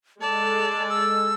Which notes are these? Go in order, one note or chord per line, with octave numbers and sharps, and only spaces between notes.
G#3 A4 D5 A5
E6